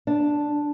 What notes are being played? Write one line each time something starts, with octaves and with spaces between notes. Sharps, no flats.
D4